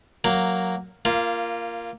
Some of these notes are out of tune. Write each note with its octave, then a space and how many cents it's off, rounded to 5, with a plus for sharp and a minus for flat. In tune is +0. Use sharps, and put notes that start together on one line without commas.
F#3 +0 A#3 -5
A#3 +0 F4 -20